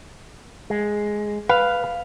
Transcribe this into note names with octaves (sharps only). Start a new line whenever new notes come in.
G#3
B4 F5